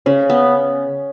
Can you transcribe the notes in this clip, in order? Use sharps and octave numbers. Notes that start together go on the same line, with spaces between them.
C#3 C#4
B3